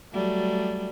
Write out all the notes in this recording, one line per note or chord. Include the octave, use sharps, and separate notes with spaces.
F#3 G3 A3